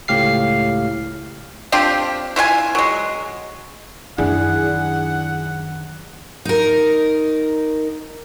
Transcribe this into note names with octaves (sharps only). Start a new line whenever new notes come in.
C#2 A2 G4 F5 C7
C4 D4 F4 G4
E4 F4 F5 G#5
F#3 G#3
F#2 D#3 D4 E4 G#4 F#5
D#4 A#4